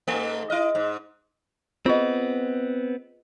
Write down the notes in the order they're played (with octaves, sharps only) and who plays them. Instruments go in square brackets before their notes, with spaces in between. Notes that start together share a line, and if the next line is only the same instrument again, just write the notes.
[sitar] G#2 A3
E4 D#5
G#2
[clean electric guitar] B3 C4 [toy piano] F4 G#4 D#5